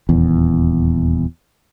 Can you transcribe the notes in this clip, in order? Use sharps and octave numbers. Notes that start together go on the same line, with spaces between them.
D#1 E2